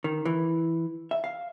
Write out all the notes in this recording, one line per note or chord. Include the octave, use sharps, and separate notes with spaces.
D#3
E3
E5
F5